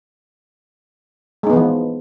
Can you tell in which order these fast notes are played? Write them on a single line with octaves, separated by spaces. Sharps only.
G#3 D#4 B3 E3 F3